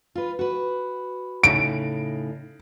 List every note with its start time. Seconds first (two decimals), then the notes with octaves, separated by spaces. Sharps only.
0.15 F4 B4
0.39 F#4 B4
1.43 A2 C#3 D#4 D7